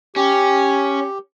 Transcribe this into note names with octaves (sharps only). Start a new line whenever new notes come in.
C#4 G4